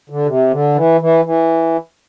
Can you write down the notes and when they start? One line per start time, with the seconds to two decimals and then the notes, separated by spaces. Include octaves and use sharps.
0.10 D3
0.26 C3
0.51 D3
0.75 E3
1.01 E3
1.25 E3